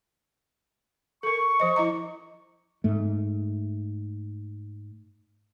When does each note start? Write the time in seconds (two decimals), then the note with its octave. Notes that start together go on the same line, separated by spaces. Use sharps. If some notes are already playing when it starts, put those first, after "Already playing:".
1.23 A4 A#4 C#6
1.60 F3 C5 D#5
1.76 E4 D#5 A#5
2.84 G#2 A3